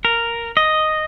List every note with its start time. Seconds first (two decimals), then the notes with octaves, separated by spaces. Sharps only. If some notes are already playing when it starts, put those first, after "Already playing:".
0.05 A#4
0.57 D#5